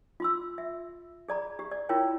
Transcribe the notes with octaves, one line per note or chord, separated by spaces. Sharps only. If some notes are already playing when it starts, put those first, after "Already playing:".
F4 C6 E6
E5
G#4 D5 A#5 B5
G4
D5
E4 F4 A#4 C#5 G5